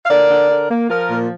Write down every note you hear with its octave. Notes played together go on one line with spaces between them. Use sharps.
F5
D3 A#4 D5
D3
D3
A#3
F3 F4 A#4
A#2